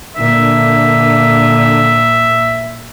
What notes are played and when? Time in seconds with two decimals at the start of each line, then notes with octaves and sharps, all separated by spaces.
0.16 A#2 D3 E5